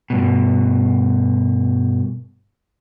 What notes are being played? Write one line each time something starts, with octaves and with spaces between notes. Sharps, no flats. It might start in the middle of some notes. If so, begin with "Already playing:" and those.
G2 B2